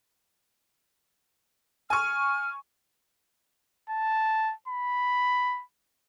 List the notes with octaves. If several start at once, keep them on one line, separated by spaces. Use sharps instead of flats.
G#5 C#6 F6
A5
B5